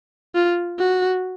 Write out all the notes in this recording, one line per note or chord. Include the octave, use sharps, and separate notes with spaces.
F4
F#4